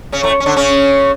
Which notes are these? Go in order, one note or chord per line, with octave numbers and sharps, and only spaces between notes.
C#3 C#4
A2 A3
C#4
D3 D4
C#3 C#4